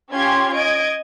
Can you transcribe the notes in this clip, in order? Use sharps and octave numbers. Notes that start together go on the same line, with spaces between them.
C#4 F4 G4 C6 G#6
D#5 G#6 D7